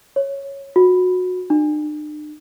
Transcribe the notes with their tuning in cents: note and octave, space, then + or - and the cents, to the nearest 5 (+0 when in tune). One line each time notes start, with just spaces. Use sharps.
C#5 -5
F#4 -20
D4 +45